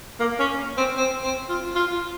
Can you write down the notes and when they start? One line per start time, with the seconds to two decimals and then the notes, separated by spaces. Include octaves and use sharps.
0.20 A#3
0.40 C#4
0.77 C4
0.97 C4
1.23 C4
1.49 F4
1.75 F4